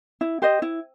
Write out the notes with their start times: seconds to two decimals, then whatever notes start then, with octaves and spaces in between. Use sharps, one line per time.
0.21 E4
0.42 G4 C5 D#5
0.62 E4